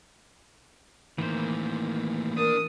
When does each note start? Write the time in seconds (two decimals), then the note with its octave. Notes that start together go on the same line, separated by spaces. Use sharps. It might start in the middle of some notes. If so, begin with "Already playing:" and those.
1.18 A2 D#3 E3 A#3 C5
2.37 D4 A#4 D#6